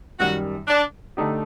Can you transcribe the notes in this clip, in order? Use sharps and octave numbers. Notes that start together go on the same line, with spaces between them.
F#2 D#3 G3 F#4
D4
D3 A3 D#4 G4